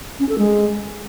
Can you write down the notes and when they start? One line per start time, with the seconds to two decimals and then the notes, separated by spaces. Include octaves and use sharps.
0.19 C#4
0.29 A4
0.38 G#3